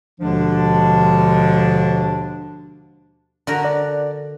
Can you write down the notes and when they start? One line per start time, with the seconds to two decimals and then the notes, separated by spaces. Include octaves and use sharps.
0.20 D#2 B2 D3 F3 G#3 D4
3.47 D3 F#4 A#4
3.65 D5